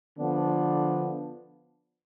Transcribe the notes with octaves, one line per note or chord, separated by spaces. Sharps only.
D3 F3 B3 D4